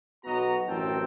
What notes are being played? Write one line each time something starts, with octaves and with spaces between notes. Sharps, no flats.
B1 B3 F#4 D#5 A#5
A1 F#2 C4 G5 A5 A#5